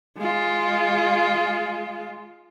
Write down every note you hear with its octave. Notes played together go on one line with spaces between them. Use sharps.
G#3 F4